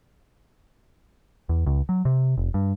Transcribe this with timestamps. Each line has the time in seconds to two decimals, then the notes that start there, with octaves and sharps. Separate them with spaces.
1.49 E2
1.66 C#2
1.89 F#3
2.05 C3
2.38 F1
2.54 G2